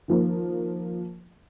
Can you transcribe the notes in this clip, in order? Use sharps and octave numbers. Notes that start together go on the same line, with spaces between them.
D#3 F3 A#3